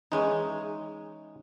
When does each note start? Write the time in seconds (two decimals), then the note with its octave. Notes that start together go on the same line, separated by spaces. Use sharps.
0.12 E3 G#3 C#4 D#4 G#5